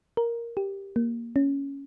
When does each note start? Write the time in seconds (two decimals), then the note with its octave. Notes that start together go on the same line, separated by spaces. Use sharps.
0.17 A#4
0.57 G4
0.96 A#3
1.36 C#4